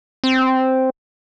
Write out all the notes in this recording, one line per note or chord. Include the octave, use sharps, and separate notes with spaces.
C4